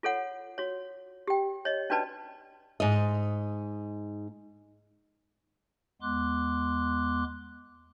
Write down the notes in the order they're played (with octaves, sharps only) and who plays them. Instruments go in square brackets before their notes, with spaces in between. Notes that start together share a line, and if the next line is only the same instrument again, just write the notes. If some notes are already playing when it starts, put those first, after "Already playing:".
[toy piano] F4 A4 C#5 F#5
F#4 C#5
G4 G5
C#5 D#5
C#4 D4 F#4 B4 D5 A5
[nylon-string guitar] G#2 D#5
[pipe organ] E2 G#3 B3 C6 D6 F#6